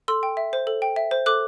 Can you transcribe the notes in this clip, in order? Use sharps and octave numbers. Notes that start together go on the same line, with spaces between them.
A4 C6 E6
G5
E5
C5
A4
G5
E5
C5
A4 D6 F#6